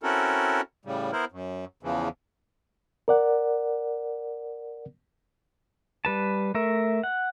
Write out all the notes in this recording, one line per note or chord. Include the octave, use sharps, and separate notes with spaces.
C4 C#4 E4 F#4 A4 A#4
A2 C#3 G3
B3 E4 A#4 C5
F#2
E2 C#3 E3 F3
A#4 D5 F#5
G3 B4 A5
A3 A#4 E5
F#5